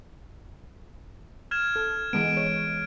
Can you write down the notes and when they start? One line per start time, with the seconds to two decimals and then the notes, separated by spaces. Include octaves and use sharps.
1.51 F6 G#6 E7
1.76 A4
2.13 E3 G#3 B3 D7
2.37 C#5